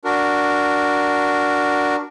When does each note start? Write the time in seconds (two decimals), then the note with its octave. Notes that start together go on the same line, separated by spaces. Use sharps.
0.05 D4 F#4 A#4